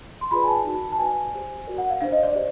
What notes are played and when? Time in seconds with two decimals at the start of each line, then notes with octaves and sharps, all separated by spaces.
0.21 C6
0.31 F4 G#4 B4 D5 B5
0.44 G#5
0.48 A5
0.65 D#4 F#4 A#4
0.92 A5
0.98 F#4 B4 D5 G#5
1.34 G4 C5
1.67 F#4 A#4 D5
1.78 F#5
1.90 F5
2.01 D4 G4 C5 F5
2.12 D#5
2.23 D5
2.35 G4 C5